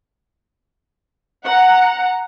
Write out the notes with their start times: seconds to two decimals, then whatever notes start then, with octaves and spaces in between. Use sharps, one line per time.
1.48 F#5 A#5